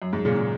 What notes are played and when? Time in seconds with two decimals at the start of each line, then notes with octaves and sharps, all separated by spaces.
0.02 F#2
0.13 G#2
0.25 A#2 C#3
0.36 A#2